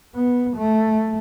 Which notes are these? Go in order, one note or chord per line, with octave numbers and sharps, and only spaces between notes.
B3
A3